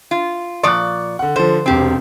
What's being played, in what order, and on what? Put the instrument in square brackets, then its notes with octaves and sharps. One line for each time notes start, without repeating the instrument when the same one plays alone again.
[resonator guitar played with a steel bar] F4
[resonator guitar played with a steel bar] A#2 F3 D5 [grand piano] C#6 F#6
[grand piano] D3 F#5
[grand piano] D3 F3 [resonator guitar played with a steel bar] C5
[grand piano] E1 C3 [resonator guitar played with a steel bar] C4 G4